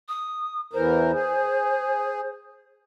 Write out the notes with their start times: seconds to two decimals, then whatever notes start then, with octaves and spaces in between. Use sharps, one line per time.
0.09 D#6
0.73 E2 E3 A#4 C5
1.13 G#4